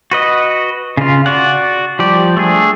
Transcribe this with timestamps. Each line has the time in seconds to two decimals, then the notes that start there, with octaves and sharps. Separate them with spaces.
0.11 F#4 B4 D#5
0.97 C#3 F4
1.26 F#4 D5 F#5
1.99 F3 G3 G4 D5
2.37 A3 D4 G#4